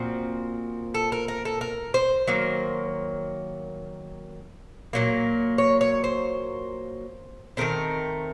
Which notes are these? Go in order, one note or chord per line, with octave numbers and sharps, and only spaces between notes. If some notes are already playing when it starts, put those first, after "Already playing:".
Already playing: A#2 F3 C4 F#4
A4
A#4
A#4
A4
A#4
C5
D#3 F#3 A#3
A#2 F#3 A#3
C#5
C#5
C5
D#3 F#3 A3 C4 A#4